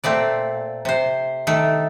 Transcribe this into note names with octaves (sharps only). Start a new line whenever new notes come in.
A#2 A3 C4 D5
C3 C5
D#3 A3